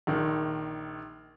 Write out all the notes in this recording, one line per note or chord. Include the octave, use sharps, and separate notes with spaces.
A#1 D#3